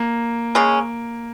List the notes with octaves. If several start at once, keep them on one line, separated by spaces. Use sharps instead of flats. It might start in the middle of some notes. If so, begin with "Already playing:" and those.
Already playing: A#3
C#3 G#3 C#4